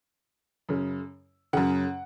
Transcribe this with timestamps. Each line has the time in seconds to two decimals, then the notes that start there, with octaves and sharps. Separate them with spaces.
0.69 F#2 C#3
1.53 F#2 C#3 F#5